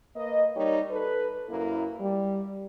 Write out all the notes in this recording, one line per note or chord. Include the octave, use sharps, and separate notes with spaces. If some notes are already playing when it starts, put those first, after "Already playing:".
A#3 B4 D#5
G3 D#4 G4 A#4 C#5
A4 B4
F#2 A#3 E4
G3